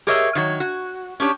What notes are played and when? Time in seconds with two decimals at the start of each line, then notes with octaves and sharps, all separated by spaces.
0.07 G4 G#4 A#4 C#5 D#5 E5
0.35 D#3 F#3 C#5
0.60 F#4
1.20 C#4 D4 G4 C#5